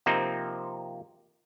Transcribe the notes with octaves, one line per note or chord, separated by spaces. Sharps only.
C3 F3 A#3 C4 D#4